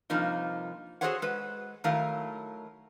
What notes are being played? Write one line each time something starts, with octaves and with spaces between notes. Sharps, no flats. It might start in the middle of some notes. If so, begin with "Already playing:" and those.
G2 C3 F3 A#3 D#4
F#4 G#4 A4 C5 C#5 F#5
G#3 B4
D#3 F#3 A3 E4 A#4 F5